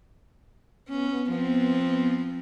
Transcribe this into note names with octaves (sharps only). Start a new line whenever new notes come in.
B3 C#4
F3 C4